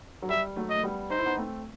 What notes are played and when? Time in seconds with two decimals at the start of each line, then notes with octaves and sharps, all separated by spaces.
0.22 F#3
0.29 G3 E5
0.56 F#3 A3
0.70 D#5
0.75 A3
0.83 G3 B3
1.10 D#4 C5
1.19 E4
1.26 B3 D#4
1.37 A3 C4